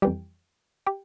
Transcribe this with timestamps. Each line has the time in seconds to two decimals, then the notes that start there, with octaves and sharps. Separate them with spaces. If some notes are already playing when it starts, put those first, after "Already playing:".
0.02 F2 E3 G3 G4 G5
0.87 G4 G5